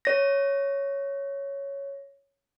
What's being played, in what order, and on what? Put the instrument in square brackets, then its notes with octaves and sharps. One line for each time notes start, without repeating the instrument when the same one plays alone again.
[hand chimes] C#5 A#6